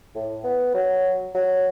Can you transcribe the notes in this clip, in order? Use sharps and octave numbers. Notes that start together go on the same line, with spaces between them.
A2
B3
F#3
F#3